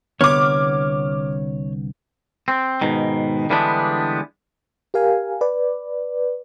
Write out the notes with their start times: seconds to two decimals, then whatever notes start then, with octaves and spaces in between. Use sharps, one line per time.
0.21 C2 D3 B3 C#5 D6 F6
2.48 C4
2.81 G#2 B2 D#3
3.50 D3 E3 G3 G#3 B3 D4
4.94 G4 A#4 F5 G#5
5.41 B4 D5